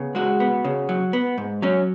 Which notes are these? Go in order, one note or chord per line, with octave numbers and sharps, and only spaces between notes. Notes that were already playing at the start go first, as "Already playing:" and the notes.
Already playing: C#3 B3
G#3 F#4
B3
C#3
F#3
B3
G#2
F#3 C#4